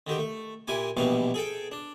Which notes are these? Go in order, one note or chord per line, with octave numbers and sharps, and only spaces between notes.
D3 D#3 G4
A3
A#2 E4 G4 G#5
A#1 B2 E3 G3 F5
G#4 A4 G5
D4